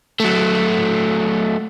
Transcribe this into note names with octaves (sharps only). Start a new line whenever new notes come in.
F#3 A3